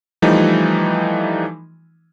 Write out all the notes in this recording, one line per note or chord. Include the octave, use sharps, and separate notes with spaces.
E3 F3 G3 A3 D#4